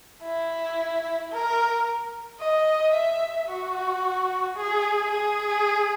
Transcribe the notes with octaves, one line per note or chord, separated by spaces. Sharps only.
E4
A#4
D#5
E5
F#4
G#4
G#4